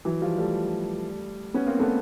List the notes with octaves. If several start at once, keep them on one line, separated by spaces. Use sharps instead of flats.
E3 F#3
F3 G3
G3 A3
B3 C#4
A#3 C4
A3 B3